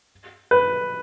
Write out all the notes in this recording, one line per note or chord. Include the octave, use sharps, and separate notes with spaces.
B4